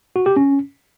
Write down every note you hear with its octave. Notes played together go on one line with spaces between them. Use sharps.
F#4
G4
C#4